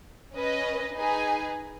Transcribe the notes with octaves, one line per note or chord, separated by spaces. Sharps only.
C#4 B4 D#5
D#4 G#4 B4 G#5